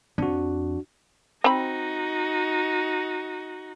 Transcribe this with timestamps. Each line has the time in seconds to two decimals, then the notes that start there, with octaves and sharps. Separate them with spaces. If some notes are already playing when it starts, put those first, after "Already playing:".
0.18 F2 D4 F#4
1.44 C4 D#4 F#4 B5